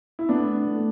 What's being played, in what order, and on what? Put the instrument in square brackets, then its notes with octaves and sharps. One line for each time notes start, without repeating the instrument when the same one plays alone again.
[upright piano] E4
[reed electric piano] A3 [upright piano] B3 D4
[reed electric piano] A3